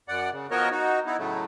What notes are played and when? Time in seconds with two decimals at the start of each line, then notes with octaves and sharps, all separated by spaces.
0.08 F#2 D5 F#5
0.33 C#3
0.51 F3 B3 F#4 A#4 C#5 D#5
0.71 D#4 F#4
1.06 B3 D#4 E4
1.18 A2 C#3 F#3 A3